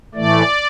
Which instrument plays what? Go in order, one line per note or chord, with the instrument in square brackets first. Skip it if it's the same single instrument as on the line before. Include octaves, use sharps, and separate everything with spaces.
[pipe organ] A2 E3 A3 D5